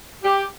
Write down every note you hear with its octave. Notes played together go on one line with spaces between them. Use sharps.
G4